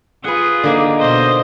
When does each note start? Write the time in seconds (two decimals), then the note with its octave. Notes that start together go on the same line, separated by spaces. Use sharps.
0.24 F4 G#4 B4 F#5
0.63 D3 A#3 D#4
0.99 B2 C5 D#5